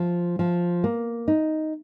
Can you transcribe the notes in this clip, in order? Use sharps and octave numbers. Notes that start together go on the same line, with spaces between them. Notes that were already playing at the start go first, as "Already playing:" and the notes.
Already playing: F3
F3
A#3
D#4